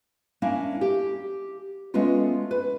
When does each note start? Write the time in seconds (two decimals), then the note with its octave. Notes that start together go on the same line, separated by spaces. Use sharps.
0.42 A#3 C#4 D4 E4
0.81 G4
1.94 G#3 A3 B3 C#4 F4
2.51 B4